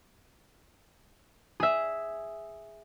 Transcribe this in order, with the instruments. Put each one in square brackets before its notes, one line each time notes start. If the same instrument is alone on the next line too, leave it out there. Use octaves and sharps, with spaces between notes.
[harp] G#4 E5